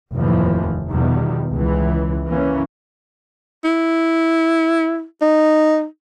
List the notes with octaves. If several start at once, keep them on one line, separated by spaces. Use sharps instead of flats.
F1 D#2 A2 E3 F3
E2 B2 D#3 F3 G3
C#2 E3
E3 A#3 C#4
E4
D#4